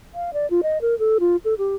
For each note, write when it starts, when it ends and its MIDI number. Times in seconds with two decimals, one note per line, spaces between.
0.14 0.33 77
0.33 0.48 74
0.50 0.61 65
0.63 0.78 75
0.82 0.98 70
0.99 1.18 69
1.20 1.36 65
1.45 1.54 69
1.58 1.76 67